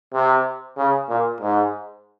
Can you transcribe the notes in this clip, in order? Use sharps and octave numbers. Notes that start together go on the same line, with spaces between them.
C3
C#3
A#2
G#2